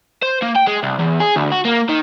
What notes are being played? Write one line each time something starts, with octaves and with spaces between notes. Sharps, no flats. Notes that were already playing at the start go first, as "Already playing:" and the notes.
C5
A#3
G5
G#3
C2
E2
G#4
D2
F#4
A#3
D#3